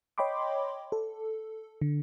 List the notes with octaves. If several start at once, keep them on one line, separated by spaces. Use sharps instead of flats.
C#5 D#5 G5 B5 C6 D6
A4
D3